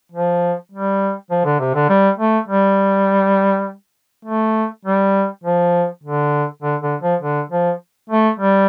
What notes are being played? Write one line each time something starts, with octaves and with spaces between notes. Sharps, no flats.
F3
G3
F3
D3
C3
D3
G3
A3
G3
A3
G3
F3
D3
D3
D3
F3
D3
F3
A3
G3